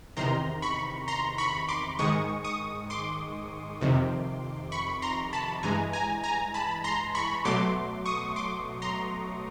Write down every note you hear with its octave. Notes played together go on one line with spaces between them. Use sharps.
E2 C3 D#3 A#5 C6
B5 C#6
A#5 C6
B5 C#6
C6 D6
G#2 D#3 G#3 C#6 D#6
C#6 D#6
C6 D6
F2 C3 D#3
B5 C#6
A#5 C6
A5 B5
G2 E3 G#3 G#5 A#5
G#5 A#5
G#5 A#5
A5 B5
A#5 C6
B5 C#6
B2 F#3 A3 C6 D6
C#6 D#6
C6 D6
A#5 C6